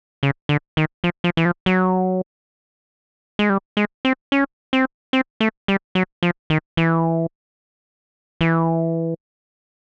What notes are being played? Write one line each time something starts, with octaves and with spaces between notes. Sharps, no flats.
C#3
D3
D#3
F3
F3
E3
F3
F#3
G#3
G3
G#3
C4
C#4
C4
C4
A3
G3
F#3
F3
D#3
E3
E3